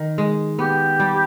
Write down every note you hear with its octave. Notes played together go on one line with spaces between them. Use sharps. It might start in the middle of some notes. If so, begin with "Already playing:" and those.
Already playing: D#3
G#3
B3 G4
G3